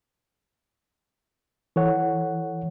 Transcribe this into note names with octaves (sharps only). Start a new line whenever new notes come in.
E3 A4 C#5 F#5